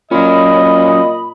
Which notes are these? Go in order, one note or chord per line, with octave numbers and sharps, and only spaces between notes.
A#2 F#3 C#4 D#5 B5